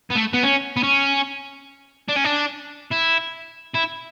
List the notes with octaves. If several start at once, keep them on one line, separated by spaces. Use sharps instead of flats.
B3
A3
B3
C#4
B3
C#4
D4
C#4
D4
E4
E4